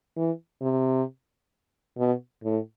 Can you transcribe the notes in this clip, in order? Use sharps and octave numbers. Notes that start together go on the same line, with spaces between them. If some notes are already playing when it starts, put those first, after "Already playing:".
E3
C3
B2
A2